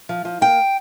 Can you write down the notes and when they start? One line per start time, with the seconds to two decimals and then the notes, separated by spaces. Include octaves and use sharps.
0.09 F3
0.25 F3
0.41 A#3 G5